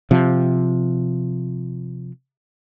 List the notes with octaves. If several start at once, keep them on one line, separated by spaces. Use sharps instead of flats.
C3 F3